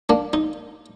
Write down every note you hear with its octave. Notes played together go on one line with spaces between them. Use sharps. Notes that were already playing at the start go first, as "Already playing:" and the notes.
A#3 D4
D#4